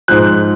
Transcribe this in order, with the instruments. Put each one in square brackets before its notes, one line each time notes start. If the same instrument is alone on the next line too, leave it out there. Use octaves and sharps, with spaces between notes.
[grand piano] G#2 F3 F#6